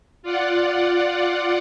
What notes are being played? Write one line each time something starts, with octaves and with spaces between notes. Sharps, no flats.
F4 D5 F#5